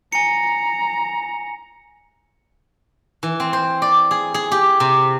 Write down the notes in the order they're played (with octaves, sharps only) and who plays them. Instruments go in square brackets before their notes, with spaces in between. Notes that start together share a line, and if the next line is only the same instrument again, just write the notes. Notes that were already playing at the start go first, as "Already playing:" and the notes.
[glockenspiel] G#5 C#7 [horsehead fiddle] A#5
[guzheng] E3
C4
C5
D5
G#4
G#4
G4
C3